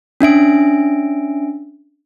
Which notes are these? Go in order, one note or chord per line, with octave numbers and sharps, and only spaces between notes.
C#4 D4 E5 D7